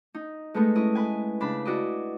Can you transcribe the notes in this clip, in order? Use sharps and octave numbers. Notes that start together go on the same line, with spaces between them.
D#4
G#3 A3 B3 D#4
C#4 E4 D#5
B4 G#5
C#3 D4 B5
E4 F#4 D5 D#5